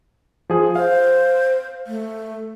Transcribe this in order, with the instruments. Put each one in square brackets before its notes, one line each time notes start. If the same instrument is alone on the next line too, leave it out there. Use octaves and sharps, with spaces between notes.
[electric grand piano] F3 G#4
[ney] C5 [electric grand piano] F5
[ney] A3